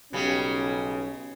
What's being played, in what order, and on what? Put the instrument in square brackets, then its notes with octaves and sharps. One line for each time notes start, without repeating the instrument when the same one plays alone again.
[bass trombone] B1 [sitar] C#3 G3 [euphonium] C#4